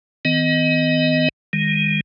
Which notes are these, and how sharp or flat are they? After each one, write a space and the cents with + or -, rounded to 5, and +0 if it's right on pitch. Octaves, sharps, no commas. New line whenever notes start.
D#3 +40 B3 +40 D#5 +0
D#3 +0 G#3 -35